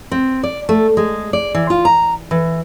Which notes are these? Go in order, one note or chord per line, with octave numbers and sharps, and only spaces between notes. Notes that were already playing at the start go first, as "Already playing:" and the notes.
C4
D5
A3
G#3
D5
E3
F4
A#5
E3